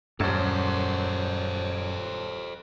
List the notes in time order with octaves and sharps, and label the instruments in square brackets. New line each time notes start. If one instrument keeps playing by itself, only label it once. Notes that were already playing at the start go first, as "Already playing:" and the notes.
[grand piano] D#1 [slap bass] F#2 [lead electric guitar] A4 C5